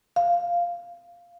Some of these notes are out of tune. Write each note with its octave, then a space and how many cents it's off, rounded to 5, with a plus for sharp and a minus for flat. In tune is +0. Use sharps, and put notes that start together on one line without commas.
F5 -5